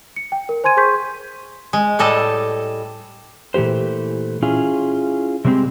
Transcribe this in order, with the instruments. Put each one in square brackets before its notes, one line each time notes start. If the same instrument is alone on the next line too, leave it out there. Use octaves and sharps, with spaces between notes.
[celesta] C#7
G5
A#4
C5 G#5 C6 G#6 D#7
G#4 C5 C6 C#6 G6 B6
[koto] G#3
A2 G3 A4 D#5 A5
[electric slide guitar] A#2 E3 A3 G4 C5
C#4 E4 F4 G#4
C3 G3 G#3 A#3 C4 G4